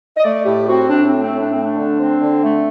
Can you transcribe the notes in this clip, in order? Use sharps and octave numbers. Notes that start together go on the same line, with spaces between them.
D#5
A3 D5
A2 G4
C4 F#4
A2 D4
C4
A3
C4
A2
D4
A3 C4
D4
D3
C4
D3
A3